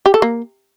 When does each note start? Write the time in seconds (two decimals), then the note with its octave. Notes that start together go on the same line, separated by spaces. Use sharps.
0.06 G4
0.14 A4
0.22 A#3